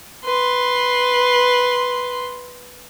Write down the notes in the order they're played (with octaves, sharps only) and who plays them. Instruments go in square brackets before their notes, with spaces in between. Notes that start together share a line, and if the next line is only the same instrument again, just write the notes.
[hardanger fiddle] B4 C6